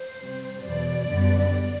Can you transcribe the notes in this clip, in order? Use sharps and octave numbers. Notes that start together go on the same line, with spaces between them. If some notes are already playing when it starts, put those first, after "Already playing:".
Already playing: C5
C3 G3 C4
E2 B2 F#3 D5
F#2 D3 G3 B3